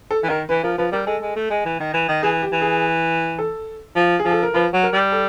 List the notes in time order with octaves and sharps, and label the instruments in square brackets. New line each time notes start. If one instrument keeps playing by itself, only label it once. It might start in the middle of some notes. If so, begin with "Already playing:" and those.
[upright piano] A4
[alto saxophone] E3
[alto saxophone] D#3 [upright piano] A#4
[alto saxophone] E3 [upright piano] B4
[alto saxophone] F3 [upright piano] A#4
[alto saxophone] F3 [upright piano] B4
[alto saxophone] G3 [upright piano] A#4
[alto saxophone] G#3 [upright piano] A4
[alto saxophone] G#3
A3
G#3
E3
D#3
E3
D#3
[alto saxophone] E3 [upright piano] G#4
[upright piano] G4
[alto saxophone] E3
[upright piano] G#4
A4
[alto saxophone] F3
[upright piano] G#4
[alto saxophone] F3
[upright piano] A4
A#4
[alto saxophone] F3 [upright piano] B4
[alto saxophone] F#3
[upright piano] A#4
[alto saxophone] G3
[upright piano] A4